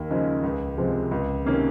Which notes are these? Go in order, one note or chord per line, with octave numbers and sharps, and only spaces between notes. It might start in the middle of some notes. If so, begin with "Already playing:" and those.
Already playing: D#2
C#3 F3 G#3 D#4
C#2
C3 F3 G#3
C#2
C3 D#3 A#3 C#4